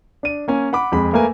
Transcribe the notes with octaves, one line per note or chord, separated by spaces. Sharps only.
D4 D#7
A#3 C#4 G#5
F#5 B5 D6
F2 G#3 B5
A3 A#3 A#4 B4 G#5